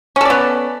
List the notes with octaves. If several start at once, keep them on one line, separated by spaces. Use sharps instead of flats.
B3 C#4 A4 D5